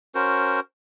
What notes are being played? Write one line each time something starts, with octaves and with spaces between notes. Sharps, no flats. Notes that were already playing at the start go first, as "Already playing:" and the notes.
C#4 F#4 A#4 C5